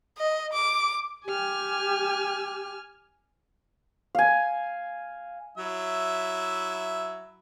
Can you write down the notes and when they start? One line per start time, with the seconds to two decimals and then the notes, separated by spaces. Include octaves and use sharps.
0.18 D#5
0.53 D6
1.26 G4 G#5 F6
4.15 F5 G#5
5.58 F#3 E4 E5